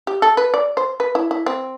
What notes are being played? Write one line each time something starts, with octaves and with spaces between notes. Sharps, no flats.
G4
A4
B4
D5
C5
B4
E4
E4
C4